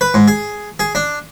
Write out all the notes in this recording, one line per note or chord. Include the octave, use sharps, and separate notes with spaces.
B4
G#2
G#4
G#4
D4